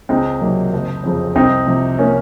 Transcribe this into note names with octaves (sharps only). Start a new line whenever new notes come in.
C#2 C4 D#4
C3 D#3 F#3 A#3
F#1
F2 C#3 F3
C2 C4 D#4
C3 F3
A#3 C#4